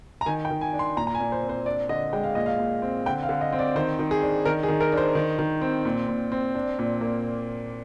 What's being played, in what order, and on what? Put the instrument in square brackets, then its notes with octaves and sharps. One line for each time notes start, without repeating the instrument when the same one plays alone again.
[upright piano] A#5
D#3 G#5
G5
D#3
G#5
D4
C6
A#2 A#5
A#5
G#5
A#2
C5
C4
C5
D4 D5
D3 D#5
G#3 G5
F5
A#2 D#5
F5
A#2
C4
D3 G5
F5
D3
D#5
C4
D5
D#3 C5
D#3
G#4
D4
D#3 A#4
G#4
D#3
A#4
D4
C5
D#3
D#3
C4
A#2
A#2
C4
D4
A#2
A#3